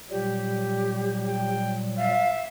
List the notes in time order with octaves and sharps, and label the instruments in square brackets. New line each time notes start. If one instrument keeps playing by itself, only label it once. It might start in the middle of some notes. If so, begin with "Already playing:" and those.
[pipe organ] A#2 F#3 G3 [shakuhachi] G4
[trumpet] G5
[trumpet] E5 [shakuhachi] F5